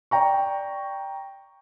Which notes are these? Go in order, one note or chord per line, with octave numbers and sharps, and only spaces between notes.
D5 G5 A#5 C#6